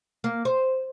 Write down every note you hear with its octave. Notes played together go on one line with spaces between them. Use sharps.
A#3
C5